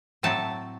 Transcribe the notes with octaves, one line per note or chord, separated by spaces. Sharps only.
A2 F#3 A3 C4 A5